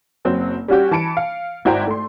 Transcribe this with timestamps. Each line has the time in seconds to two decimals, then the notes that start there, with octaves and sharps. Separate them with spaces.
0.25 F#1 F#3 C4
0.68 G3 C#4 F#4 G4
0.91 E3 A5 B5 C#7 D7
1.17 F5
1.65 G#1 E4 F#4 C5 G5 A#5
1.87 A3 C6